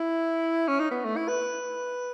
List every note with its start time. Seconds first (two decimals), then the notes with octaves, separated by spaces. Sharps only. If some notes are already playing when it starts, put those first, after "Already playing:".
Already playing: E4
0.68 C#4
0.79 D#4
0.91 B3
1.05 A3
1.17 E4
1.28 B4